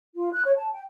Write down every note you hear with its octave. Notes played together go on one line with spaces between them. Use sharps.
F4
F#6
C#5
A5
G5